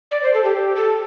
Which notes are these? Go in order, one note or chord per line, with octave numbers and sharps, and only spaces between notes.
D5
C5
A4
G4
A4